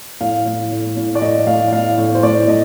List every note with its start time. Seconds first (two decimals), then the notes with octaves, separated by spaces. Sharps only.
0.21 A2 F5
0.46 A2
0.72 A2
0.97 A2
1.15 D5
1.21 A2 D#5
1.47 A2 F5
1.72 A2 F5
1.98 A2
2.14 C5
2.23 A2 D5
2.48 A2 D#5